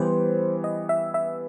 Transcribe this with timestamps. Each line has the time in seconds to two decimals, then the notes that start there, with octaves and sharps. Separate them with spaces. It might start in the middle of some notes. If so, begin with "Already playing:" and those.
Already playing: E3 G3 B3 C5
0.64 D#5
0.89 E5
1.14 E5